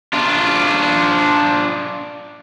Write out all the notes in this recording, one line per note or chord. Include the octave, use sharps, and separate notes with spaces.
D4 F4